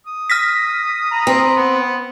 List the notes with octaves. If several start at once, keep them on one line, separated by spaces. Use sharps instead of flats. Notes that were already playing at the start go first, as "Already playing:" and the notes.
D#6
F6 A#6 B6
A#5 B5
C4
B3 B5